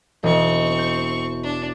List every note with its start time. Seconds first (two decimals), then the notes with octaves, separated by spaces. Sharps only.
0.23 E1 C4 D#5 C#6
0.79 G6
1.43 D4